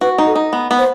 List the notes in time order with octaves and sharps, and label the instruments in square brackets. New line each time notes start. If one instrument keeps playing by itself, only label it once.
[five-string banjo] F#4 [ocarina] B4
[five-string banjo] D#4
[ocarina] A4
[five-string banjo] D#4
B3
B3
[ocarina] C5